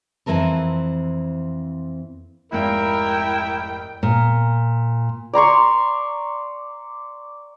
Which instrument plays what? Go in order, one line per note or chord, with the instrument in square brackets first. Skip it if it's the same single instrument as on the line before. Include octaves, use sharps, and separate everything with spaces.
[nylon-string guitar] F2 B2 E3 C4 A#4 A5
[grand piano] F1 G#2 F5 [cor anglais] E4 [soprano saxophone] A#4 [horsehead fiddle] G5
[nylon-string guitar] A#2
[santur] D5 A#5 C6 C#6